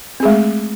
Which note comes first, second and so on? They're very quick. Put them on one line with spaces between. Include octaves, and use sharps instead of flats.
C4 G#4 G#3 A3